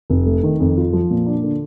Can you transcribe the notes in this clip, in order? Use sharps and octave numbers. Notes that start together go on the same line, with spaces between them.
F1
A3
D#3
F2
F4
F3
A#2
D4
D3